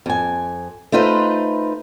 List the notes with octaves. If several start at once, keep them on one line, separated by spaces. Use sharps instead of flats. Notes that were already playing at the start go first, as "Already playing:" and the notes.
F2 G#5
A3 D#4 F4 B4 C5